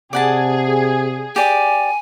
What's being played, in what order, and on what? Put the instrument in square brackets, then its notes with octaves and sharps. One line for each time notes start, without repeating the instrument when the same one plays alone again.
[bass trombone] C3 [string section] G#4 [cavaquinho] D5 F#5 A5
[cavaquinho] G4 D5 [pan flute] G#5